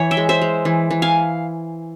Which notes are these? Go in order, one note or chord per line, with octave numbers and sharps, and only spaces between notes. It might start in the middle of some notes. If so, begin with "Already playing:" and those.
Already playing: E3 C#5
E5 G5
G#3
C5 E5
G#3
E3
E3
F5 G#5